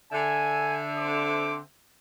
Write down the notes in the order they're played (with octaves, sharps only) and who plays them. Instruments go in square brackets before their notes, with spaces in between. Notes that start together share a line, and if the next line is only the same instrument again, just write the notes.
[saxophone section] D3 E5 [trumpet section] G#5
[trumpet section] C4 C5 D6